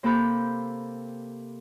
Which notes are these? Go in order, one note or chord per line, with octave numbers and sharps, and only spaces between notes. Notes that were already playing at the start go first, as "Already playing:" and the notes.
C3 A#3 G4 A4 B5 G6